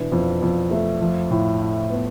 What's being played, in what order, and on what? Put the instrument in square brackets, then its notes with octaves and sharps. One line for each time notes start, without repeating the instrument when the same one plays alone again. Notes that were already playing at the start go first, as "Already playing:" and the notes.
Already playing: [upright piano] B2 E3 D4
F2
F2
A3
F3
A2
E4
B3